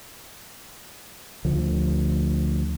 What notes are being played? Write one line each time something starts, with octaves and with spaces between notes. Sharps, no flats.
D2 D3 F3